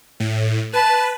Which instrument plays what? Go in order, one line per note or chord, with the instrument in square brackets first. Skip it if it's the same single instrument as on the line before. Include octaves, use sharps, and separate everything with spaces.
[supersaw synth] A2
[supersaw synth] B4 [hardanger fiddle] A5